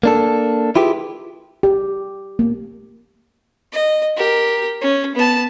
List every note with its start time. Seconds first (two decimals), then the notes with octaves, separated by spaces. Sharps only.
0.03 A#3 D4 A4
0.76 E4 F4 G4 G#4 B4
1.63 G4
2.39 A#3
3.73 D#5
4.17 G4 A#4
4.81 C#4
5.15 B3 A5